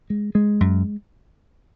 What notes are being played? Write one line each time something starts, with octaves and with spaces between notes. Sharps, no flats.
G#3
G#3
F#2